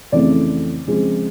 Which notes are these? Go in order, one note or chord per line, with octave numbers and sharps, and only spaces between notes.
F2 C#3 E3 A3 D5
C#3 F3 G#3 C4